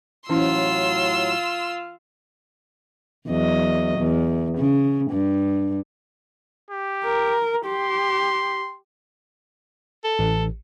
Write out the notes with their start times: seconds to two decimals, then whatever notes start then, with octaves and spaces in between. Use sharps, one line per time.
0.29 A2 E3 F#3 C#4 E4 F4 C6 E6
3.27 E2 F#3 D#5
3.99 E2
4.57 C#3
5.11 G2
6.71 G4
7.05 A#4
7.65 G4 C6
10.04 A4
10.19 A1